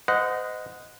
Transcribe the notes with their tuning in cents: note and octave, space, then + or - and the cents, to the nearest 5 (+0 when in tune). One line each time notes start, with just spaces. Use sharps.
C5 -40 D#5 +0 F#5 -15